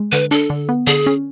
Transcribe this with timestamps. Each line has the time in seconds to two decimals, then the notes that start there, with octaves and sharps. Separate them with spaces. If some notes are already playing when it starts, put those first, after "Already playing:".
Already playing: G#3
0.12 D3 B4
0.31 D4 A4
0.50 D3
0.69 B3
0.87 D3 G#4
1.07 C#4